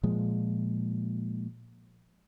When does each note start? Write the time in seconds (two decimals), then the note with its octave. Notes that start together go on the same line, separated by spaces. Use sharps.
0.03 A#2 F3 G#3